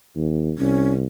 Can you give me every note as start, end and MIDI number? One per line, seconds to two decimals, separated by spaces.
0.16 0.53 39
0.58 1.07 36
0.58 0.92 61